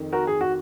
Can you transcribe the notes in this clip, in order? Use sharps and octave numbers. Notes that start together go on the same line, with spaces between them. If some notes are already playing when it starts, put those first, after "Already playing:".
Already playing: F2 D#3
F#4 A#4
G#4
F#4